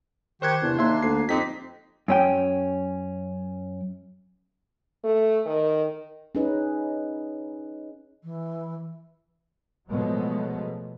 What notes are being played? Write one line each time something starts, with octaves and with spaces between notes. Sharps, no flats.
D#3 G4 C5 G5 C#6 F#6 G#6
E2 C3 D4
D#2 A#3 E5 C6
D2 C7
F2 C4 D#4 G4 B6
F#2 C#4 G5
A3
D#3
C#4 D#4 G#4 B4 D#5
E3
B2 F3 F#3 G#3 A3